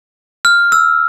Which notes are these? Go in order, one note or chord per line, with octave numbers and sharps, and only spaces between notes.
F6
E6